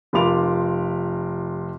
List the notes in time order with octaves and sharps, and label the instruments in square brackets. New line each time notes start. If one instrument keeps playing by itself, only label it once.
[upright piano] F1 F4 A#4 B5 D6 F7